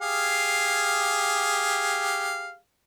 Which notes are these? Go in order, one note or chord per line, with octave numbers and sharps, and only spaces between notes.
G4 G#4 F5